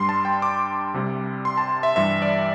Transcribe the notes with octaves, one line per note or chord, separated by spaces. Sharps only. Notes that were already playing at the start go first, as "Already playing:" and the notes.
Already playing: G2 G3 C6
A5
G5
D6
C2 C3 G3
C6
A5
E5
G2 E3 G3 E5
D5